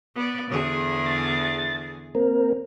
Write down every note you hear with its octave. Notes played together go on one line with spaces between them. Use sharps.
B3 D5
E2 D3 G#4
A6
A#3 C4 A#4